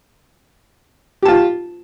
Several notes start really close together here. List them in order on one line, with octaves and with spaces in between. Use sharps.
G4 A5 F4